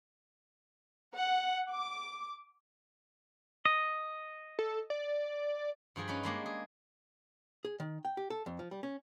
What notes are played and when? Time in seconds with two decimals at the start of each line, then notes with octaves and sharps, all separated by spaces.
1.15 F#5
1.72 D6
3.65 D#5
4.59 A4
4.90 D5
5.96 G2 F3 G#4 G5
6.08 C#4 D#4 B4 B5
6.23 G3 G#3 A#3 D4
6.46 G#4
7.65 G#4
7.80 D#3
8.05 G5
8.17 G4
8.30 A4
8.46 F2
8.59 F3
8.71 G3
8.83 C#4